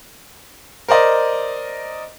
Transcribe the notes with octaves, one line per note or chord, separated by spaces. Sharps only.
A#4 C5 D5 D#5